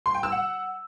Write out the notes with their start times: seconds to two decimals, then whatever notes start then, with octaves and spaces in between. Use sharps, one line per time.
0.06 C6
0.14 G5
0.23 E6
0.32 F#5